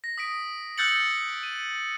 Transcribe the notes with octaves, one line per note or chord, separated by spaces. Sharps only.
A#6
D#6 B6 D7
E6 F#6 G6 A6 C#7 F#7
D#7